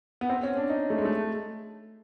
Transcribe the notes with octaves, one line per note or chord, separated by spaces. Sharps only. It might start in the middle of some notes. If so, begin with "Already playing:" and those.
B3
C4
C#4
D4
D#4
A3
G#3
A3